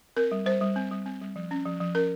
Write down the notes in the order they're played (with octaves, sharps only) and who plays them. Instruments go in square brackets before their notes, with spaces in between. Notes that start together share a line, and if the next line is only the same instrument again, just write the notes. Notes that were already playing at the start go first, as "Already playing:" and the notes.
[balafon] C4 A#4
G3
G3 C5
G3
C4
G3
C4
G3
F3
C#4
F3
F3
C#4 A#4